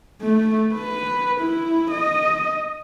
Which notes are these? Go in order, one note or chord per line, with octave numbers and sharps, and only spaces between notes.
A3
B4
E4
D#5